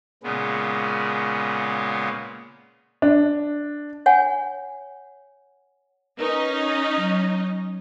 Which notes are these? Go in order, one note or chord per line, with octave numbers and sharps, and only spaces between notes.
A#2 C#3 G#3 B3
D4
C#5 F#5 G#5
C#4 D#4 A#4 B4 D#5
F#3